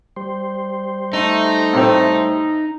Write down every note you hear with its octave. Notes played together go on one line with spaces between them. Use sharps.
G3 C5
A3 D#4
A2 C3 C4